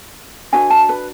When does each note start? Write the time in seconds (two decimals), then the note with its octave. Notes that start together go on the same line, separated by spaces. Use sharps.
0.52 D4 F#4 B4 G#5
0.70 A5
0.89 B4